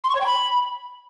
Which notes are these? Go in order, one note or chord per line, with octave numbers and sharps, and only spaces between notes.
C6
C#6
C#5
G5
B5